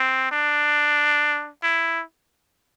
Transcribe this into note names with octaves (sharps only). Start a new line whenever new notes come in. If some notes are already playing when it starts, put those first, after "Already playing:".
Already playing: C4
D4
E4